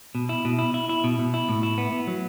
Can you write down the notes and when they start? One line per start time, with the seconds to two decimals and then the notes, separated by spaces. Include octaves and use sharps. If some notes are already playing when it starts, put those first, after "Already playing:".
0.15 B2
0.29 E4
0.45 B2
0.59 E4
0.74 E4
0.89 E4
1.04 B2
1.19 B2
1.34 E4
1.49 A2
1.63 E4
1.78 B3
1.92 B3
2.07 F#3